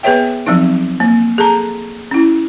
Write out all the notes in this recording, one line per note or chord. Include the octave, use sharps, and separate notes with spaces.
B3 G#4 B4 C#5 E5 G5
F3 F#3 C4 D#4
A#3
G#4 A4 A5 A#5
C#4 E4